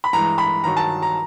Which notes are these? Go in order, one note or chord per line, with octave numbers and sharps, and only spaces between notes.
B5
G2 E3 G#3 A#5
B5
G2 D#3 F#3 A#5
A5
A#5